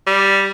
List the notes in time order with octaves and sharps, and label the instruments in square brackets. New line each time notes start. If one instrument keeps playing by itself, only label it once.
[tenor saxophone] G3